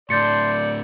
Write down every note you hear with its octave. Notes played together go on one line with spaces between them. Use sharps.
A2 D3 D5 C6 G6 A6 C#7